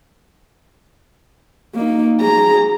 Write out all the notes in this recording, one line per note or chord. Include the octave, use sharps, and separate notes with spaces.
A#3 D#4
G#4 A#5